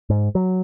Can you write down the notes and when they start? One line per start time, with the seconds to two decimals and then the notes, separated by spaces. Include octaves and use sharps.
0.10 G#2
0.35 F#3